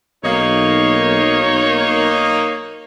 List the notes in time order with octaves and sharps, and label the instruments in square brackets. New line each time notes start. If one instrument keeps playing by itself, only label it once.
[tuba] B1 [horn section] A#3 D#4 [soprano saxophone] C#5